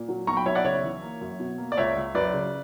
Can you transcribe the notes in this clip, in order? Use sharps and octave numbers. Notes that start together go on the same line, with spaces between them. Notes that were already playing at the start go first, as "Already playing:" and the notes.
Already playing: A#2
F#3
B1 A#5 C#6
G5 B5
B1 C#5 E5
D5 F#5
C#3 C#5 E5
E3
A#3
F#2
B2
A#3
D5
C#2 C#5 E5
C#2
F#2 B4 D5
C#3